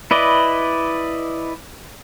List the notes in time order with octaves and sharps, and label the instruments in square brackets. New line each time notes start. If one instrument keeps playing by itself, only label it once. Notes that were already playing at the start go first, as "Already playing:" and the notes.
[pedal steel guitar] E4 B4 D5 D#5